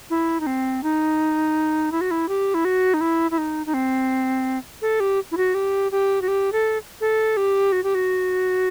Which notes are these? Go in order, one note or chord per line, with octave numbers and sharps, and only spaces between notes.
E4
D#4
C4
D#4
E4
F#4
E4
G4
E4
F#4
D#4
E4
E4
D#4
D#4
C4
A4
G4
E4
F#4
G4
G4
F#4
G4
A4
A4
G4
F#4
G4
F#4